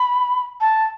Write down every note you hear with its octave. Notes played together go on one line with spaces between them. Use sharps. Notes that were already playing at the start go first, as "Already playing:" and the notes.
Already playing: B5
A5